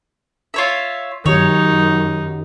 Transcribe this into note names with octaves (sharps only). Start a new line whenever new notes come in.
F4 C#5 E5
F#2 D#3 D#4 G4 C#5